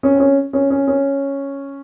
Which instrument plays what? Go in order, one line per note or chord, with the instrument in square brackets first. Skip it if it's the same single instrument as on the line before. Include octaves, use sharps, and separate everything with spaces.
[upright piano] C#4
C4
C#4
C#4
C#4
C#4